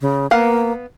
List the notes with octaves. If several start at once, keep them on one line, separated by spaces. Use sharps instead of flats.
C#3
A#3 B3 F5 F#5